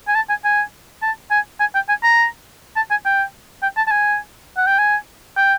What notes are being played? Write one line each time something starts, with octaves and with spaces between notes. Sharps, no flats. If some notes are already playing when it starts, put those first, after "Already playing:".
G#5
A5
G#5
G#5
A5
G#5
G#5
G5
G#5
A#5
A5
G#5
G5
G5
A5
A5
G#5
F#5
G5
G#5
G5